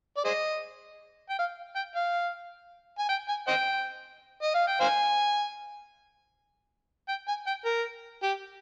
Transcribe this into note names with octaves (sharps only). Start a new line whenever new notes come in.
D5
G#4 C5 D#5
G5
F5
G5
F5
G#5
G5
G#5
C5 D#5 G5
D#5
F5
G5
C5 F5 G#5
G5
G#5
G5
A#4
G4